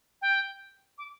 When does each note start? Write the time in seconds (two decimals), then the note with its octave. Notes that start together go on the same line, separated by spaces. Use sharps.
0.22 G5
0.98 D6